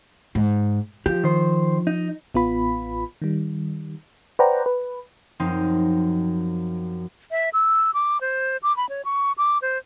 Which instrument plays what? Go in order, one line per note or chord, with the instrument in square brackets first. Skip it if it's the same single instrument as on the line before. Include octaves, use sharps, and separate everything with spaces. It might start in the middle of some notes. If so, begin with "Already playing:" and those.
[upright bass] G#2
[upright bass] F3 [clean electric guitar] G4
[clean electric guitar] D#3 C5
D#4
[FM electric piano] A1 B3 F4 B5
D#3 G3
B4 C5 D5 F#5 G5 A#5
B4
[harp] F#2 F3 C4 D#4
[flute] E5
E6
D6
C5
D6
B5
C#5
C#6
D6
C5